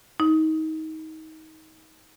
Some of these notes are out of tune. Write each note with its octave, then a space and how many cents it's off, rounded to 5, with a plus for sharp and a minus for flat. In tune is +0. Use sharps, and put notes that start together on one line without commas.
D#4 +25